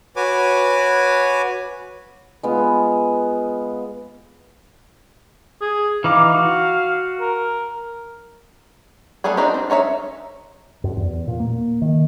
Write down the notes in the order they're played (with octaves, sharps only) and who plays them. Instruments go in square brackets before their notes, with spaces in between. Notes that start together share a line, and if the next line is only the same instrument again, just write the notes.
[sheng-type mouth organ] F#4 B4 C#5 G#5 D6
[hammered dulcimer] G#3 B3 F4
[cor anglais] G#4
[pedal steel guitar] E3 D#4 D6 [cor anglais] F5
[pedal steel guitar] F#4
[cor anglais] A#4
[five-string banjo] G3 A3 B3 E4 G#4
C4 D4 D#4 F#4 G4
C4
C#4 D#4 C#5 E5
[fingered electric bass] F#2
E2
A#2
A#3
D#3